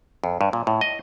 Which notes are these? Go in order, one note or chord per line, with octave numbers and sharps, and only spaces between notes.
F2
G2
A#2
A2
D#5